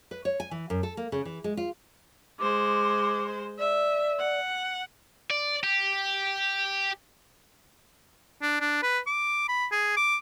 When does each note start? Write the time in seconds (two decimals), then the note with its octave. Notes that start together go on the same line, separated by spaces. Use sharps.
0.11 B4
0.25 C#5
0.40 G#5
0.51 E3
0.70 F#2
0.83 A4
0.97 A#3
1.12 C#3
1.25 E3
1.44 G#3
1.57 F4
2.39 G#3 C5 D6
3.59 D5 E5
4.19 F#5
5.31 D5
5.64 G4
8.42 D4
8.60 D4
8.83 B4
9.07 D6
9.48 B5
9.71 G#4
9.97 D6